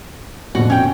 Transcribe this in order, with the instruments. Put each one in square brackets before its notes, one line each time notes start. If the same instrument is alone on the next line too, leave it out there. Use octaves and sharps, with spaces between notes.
[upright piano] F2 B2 D3 [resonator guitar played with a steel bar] F#4
[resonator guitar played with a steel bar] C#4 G5